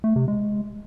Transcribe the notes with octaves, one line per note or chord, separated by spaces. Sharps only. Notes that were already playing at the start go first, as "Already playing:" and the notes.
A3
C3
G#3